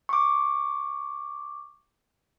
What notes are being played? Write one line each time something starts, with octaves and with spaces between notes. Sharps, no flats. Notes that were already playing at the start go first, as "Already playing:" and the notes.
C#6 D6